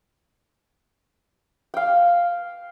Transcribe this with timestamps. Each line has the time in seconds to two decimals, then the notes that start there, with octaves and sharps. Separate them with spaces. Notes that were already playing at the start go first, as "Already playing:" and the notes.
1.74 F5 G5